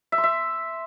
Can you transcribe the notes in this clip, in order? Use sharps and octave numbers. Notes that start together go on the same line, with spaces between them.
E5
C6
E5